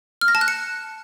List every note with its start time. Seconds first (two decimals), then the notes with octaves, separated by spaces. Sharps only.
0.21 F6
0.28 A#6
0.35 A5
0.41 F#6
0.48 C#7